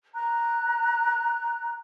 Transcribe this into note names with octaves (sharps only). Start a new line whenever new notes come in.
A#5 F#6